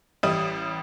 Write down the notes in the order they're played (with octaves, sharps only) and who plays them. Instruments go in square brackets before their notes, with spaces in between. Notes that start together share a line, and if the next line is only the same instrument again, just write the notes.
[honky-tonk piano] A1 G3 D#6